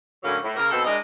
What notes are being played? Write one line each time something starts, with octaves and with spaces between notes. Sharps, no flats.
F#2 A2 D3 F#3 A#3 C#4
A2
C#3 A#3 A#4
D#2 B2 C4 A4
G#3 D4 E4 A#4 D#5